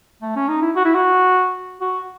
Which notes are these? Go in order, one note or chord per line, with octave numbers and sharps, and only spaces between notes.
A3
C#4
D#4
E4
F#4
E4
F#4
F#4